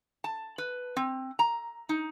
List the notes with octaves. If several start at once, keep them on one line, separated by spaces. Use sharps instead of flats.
A5
B4
C4
A#5
D#4